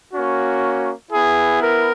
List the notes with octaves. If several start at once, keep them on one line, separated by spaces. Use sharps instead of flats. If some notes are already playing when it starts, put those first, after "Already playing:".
A#3 C#4 F#4
B3 E4 G#4
A#4